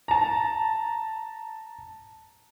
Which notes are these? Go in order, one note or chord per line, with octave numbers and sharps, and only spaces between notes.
A5 A#5